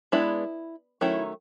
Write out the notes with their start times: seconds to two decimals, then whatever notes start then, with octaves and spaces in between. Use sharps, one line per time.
0.12 G#3 B3 D4 E4
1.01 D#3 F#3 A3 C#4 E4